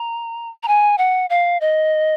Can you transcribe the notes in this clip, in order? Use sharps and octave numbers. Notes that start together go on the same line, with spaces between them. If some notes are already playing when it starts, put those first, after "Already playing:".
Already playing: A#5
A#5
G#5
F#5
F5
D#5